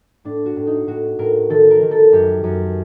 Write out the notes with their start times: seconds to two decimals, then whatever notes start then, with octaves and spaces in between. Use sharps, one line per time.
0.25 A2 D4
0.46 F#4
0.56 A2
0.67 D#4
0.87 A2 F#4
1.19 A2 A#4
1.50 D#3 A4
1.71 A#4
1.81 D#3
1.91 A4
2.12 F#2 G4
2.44 F#2